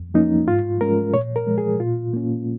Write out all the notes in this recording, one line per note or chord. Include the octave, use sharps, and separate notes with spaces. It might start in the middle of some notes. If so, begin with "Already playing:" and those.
Already playing: F2
F3 A#3 C#4 D#4
G#2 F4
G#3 C#4 A#4
A#2 C#5
A#4
F3 G#3
G#4
A#2 F4
A#3 C#4